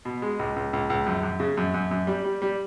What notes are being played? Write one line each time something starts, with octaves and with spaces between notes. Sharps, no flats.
B2
G#3
C#2
C#2
C#2
C#2
F#2
F#2
C#3
F#2
F#2
F#2
G3
G3
G3